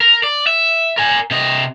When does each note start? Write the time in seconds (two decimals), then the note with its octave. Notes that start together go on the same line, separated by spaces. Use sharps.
0.01 A#4
0.23 D5
0.47 E5
0.98 A#4 G#5
1.31 C3 D#5